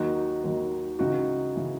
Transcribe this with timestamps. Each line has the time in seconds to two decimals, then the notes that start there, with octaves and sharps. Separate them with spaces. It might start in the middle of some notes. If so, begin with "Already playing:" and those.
Already playing: D#2 D#3 F#3 D#4 F#4
0.44 D#2 D#3 F#3
0.99 C#2 C#3 E3 D#4 F#4
1.55 C#3 E3